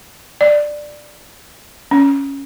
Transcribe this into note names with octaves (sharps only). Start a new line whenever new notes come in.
D5
C#4